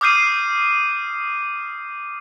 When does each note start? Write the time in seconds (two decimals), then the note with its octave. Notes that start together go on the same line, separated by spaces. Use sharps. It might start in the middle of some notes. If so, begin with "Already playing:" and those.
0.01 D6 D#6 F6 G6 C7 D#7